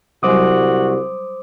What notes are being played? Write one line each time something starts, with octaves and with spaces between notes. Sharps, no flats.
C2 F#3 G3 F#4 C5 G#5 D6 D#6